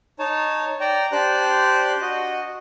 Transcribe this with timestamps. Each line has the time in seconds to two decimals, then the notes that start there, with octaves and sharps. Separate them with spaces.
0.19 D#4 C#5 A5
0.80 D5 G5 A#5
1.12 D4 G4 C5 D5 F#6
2.02 F#4 D#5